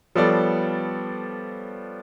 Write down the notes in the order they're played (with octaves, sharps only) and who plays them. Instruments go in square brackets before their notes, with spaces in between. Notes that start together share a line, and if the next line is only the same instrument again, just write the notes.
[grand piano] F3 G3 B3 A4 C#5 D5